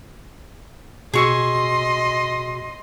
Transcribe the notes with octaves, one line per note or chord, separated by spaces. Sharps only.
B2 F#4 G#4 D#5 C6 C#6 E6